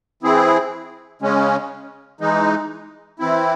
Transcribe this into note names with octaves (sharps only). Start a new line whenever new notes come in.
E3 C4 E4 G#4
C#3 G#3 C#4
E3 G#3 D#4
E3 C4 E4